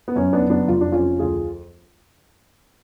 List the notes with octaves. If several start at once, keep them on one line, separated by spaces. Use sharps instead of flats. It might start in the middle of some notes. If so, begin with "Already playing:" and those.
B3
F#2 C#4
B3 D4
F#1
B3 D4
F1 F4
D4
F2 C#4 F4
D2 F4 G#4